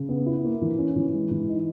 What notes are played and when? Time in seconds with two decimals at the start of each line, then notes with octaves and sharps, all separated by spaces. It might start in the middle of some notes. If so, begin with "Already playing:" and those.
Already playing: C#3
0.09 B3
0.26 E4
0.44 A#3
0.61 E3
0.78 C#4
0.96 E3
1.14 G#3
1.31 E3
1.48 D#4